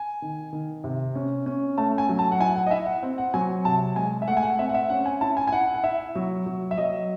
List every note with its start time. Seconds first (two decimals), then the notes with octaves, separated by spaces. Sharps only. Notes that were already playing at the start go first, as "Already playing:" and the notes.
Already playing: G#5
0.22 D#3
0.53 D#3
0.84 C3
1.15 C#4
1.46 C#4
1.78 A3 A5
1.98 G#5
2.09 F#3
2.19 A5
2.32 F#5
2.40 E4 G#5
2.56 F#5
2.66 D#5
2.71 E4 E5
2.86 F#5
3.03 C4
3.18 F#5
3.34 F#3 G#5
3.65 C3 A5
3.96 G#3 G#5
4.22 E5
4.28 A3 F#5
4.37 G#5
4.43 F#5
4.59 C4 E5
4.69 F#5
4.74 E5
4.90 C#4 F#5
5.06 G#5
5.21 E4 A5
5.37 G#5
5.48 G#5
5.53 E4 F#5
5.74 F#5
5.84 E4 E5
6.15 F#3
6.46 F#3
6.71 E5
6.77 F#3 D#5